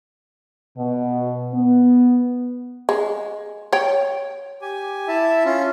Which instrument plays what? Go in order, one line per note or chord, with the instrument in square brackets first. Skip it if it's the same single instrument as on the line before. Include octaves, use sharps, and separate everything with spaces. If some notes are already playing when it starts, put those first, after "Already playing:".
[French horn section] B2
B3
[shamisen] G#3
C#5 G5
[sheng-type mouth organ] G4 G#5
E4 E5 A5
C#4 F4